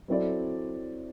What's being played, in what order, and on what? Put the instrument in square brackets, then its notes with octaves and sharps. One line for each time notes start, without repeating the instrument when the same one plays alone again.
[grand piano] F#3 C4 E4 A4 D5